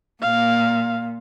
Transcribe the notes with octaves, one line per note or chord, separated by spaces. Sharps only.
A#2 F5